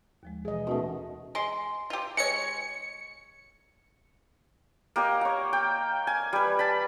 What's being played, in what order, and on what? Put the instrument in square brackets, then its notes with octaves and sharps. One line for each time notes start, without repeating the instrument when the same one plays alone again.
[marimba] D#2 F3 G#3
[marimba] B2 E3 [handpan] G#4 D#5
[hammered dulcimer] B2 A3 [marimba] C#4 D#4 A#4
[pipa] G#3 C6
F4 G4
[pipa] G#3 C#5 [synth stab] C#7
[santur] A#3 G4 D#5
C#5 F#5
G5
G#5
G3 B4
A5 B5